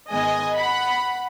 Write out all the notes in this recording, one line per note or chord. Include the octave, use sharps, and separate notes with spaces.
G#2 D#3 G#3 B3 D#5 G#5
F#5 B5